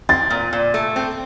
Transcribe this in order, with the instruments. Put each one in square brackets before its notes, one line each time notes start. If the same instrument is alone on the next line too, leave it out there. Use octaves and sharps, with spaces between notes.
[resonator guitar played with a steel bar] C4 [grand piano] A6
[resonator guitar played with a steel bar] A#2
A#2
A3
C4